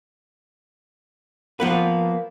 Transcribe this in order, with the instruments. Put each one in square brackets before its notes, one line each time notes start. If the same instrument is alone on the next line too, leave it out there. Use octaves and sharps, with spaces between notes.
[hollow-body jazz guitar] F3 B3 B4 [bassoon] A#3